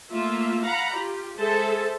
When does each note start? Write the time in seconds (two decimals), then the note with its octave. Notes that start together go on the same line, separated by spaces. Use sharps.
0.12 A3 A#3 F4 E5
0.64 F5 F#5 A#5 B5
0.94 F4 G4
1.37 G#3 G#4 A4 C5 E5 A5